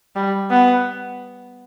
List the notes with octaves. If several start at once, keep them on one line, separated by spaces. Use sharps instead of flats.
G3
B3